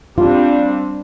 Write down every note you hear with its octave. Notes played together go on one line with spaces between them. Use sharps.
G3 C4 D4 F4